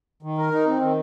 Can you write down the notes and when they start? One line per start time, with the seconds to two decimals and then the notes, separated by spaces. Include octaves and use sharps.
0.23 D#3
0.38 A#4
0.51 D#4
0.66 C4
0.82 D#3